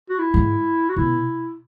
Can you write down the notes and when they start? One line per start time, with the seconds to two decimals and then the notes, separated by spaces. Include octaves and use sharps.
0.10 F#4
0.19 E4
0.34 G#2
0.89 F#4
0.96 B2 E4